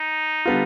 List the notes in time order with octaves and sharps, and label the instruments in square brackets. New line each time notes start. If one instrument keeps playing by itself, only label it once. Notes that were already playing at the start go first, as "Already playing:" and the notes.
Already playing: [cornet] D#4
[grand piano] D3 G3 B3 F4